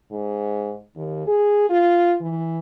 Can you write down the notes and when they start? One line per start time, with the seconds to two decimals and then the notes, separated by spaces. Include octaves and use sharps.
0.11 G#2
0.96 D#2
1.27 G#4
1.69 F4
2.20 E3